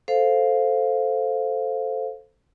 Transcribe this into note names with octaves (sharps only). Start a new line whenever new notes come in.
A4 C5 F5